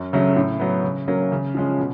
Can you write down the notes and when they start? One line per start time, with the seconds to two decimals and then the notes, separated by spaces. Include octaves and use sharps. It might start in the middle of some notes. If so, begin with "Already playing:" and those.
Already playing: F#2
0.13 C#3 F#3 A3 C#4
0.36 A2
0.60 F#3 B3
0.84 C#3
1.08 F#3 A#3 C#4
1.32 C#3
1.55 F3 G#3 C#4
1.79 B2